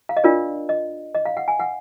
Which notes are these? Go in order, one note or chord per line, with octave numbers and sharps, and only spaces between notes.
F5
D#5
D4 F4 A#4 D5
D#5
D#5
F5
F#5
G#5
F#5